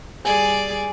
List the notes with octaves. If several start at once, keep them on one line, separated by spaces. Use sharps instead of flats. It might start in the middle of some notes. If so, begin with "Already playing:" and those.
G3 G#4 D5 G#5